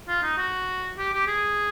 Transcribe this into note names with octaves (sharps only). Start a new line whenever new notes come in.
F4
D#4
F#4
G4
G4
G#4